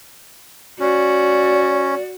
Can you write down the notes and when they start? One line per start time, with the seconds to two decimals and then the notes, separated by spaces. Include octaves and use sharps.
0.80 C#4 F#4 D5